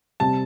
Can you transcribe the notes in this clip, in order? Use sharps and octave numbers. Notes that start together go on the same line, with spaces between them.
C3 G3 C4 A5